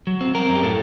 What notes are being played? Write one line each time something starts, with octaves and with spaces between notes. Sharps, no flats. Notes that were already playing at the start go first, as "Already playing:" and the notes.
F#3
C4
C4 A#4
F#2
G4
A2 A4